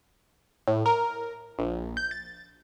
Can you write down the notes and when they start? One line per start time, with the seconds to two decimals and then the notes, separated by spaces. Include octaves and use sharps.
0.68 A2
0.86 A#4
1.59 A#1
1.97 G6
2.11 A6